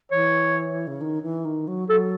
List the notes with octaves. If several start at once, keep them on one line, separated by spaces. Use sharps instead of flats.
E3 C#5
C#3
D#3
E3
D#3
F#3
F#3 A4